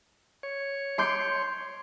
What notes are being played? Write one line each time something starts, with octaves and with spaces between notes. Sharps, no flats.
C#5
C6 D6 G6